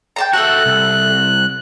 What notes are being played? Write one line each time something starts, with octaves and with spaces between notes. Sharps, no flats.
G5 A5 A#5
A3 F#4 A4 E5 A5 F#6
C2